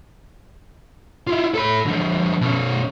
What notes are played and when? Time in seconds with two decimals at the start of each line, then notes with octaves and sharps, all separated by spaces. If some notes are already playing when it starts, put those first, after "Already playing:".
1.27 E4 F4
1.54 A4 B5
1.86 D3 F3
2.41 B2 C#4